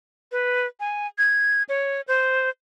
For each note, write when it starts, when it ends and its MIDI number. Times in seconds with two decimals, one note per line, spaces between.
0.32 0.66 71
0.80 1.07 80
1.18 1.63 92
1.69 2.01 73
2.08 2.50 72